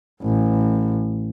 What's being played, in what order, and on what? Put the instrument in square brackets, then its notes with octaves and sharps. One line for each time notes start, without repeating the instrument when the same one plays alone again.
[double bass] A1